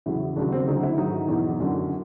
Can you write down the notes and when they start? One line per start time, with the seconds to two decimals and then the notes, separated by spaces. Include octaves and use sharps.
0.06 E2 C#3 F#3 E4
0.36 D#2 C#3 F#3 D4
0.52 C4
0.68 D2 D3 F#3 D#4
0.83 E4
0.98 G#2 D#3 F#3 D#4
1.28 E2 B2 F#3
1.60 F#2 D3 F#3